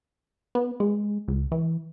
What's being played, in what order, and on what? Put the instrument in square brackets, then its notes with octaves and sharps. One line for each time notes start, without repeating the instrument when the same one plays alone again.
[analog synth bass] B3
G#3
C#2
E3